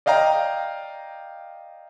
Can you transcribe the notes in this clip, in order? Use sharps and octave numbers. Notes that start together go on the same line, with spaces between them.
D5 D#5 F5 G5 A#5